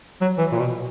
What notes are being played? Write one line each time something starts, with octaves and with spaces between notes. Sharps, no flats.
F#3
E3
A#2
B2